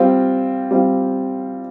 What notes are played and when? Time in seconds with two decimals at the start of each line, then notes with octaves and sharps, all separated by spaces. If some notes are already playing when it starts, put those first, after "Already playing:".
Already playing: G3 C4 F4
0.71 G3 C4 F4